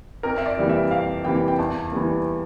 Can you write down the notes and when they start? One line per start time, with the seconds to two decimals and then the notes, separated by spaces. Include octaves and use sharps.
0.23 F2 A#4
0.38 E5
0.46 D5
0.57 C3 E3 G3 A#3
0.69 E5
0.91 F2 F5
1.25 C3 E3 G3 A#3 G5
1.48 G5
1.58 E2 A5
1.92 E3 G3 A#3